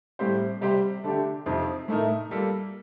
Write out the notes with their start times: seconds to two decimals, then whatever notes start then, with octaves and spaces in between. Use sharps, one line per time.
0.19 A2 G3 C4 G4 C5
0.61 C3 G3 C4 G4 C5
1.04 D3 A3 D4 G4
1.46 F2 C3 F3 C4 D#4
1.88 A2 A3 D#4 A#4
2.31 G3 A#3 F4 A4